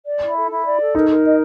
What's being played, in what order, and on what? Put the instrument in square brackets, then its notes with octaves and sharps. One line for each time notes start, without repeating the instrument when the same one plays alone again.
[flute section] D5
E4
A4
E4
D5
A4
[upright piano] D#4 [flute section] A#4
[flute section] A#4
D#5